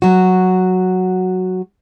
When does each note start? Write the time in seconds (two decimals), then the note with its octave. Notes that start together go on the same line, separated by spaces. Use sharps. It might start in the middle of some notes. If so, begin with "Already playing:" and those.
0.02 F#3 F#4